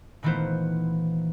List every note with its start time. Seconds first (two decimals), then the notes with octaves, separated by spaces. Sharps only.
0.23 A#2 D#3 E3 A3 B3 C5